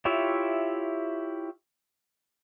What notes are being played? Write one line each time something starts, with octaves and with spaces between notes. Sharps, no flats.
E4 F4 G4 C#5 E5